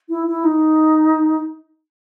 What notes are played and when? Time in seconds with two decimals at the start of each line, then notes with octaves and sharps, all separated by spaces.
0.09 E4
0.27 E4
0.44 D#4